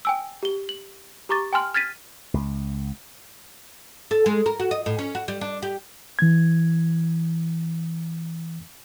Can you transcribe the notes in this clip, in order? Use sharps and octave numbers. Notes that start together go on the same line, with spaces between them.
G5 G#5 E6
G4 G7
F#7
G4 A#5 C#6 D6 A6
G5 G#5 C6 F6 F#7
F6 G#6 A6 B6 D#7
C#2
A4
G#3
A#4
F#4
D#5
A2
C#4
F#4
G3
D4
G4
E3 G#6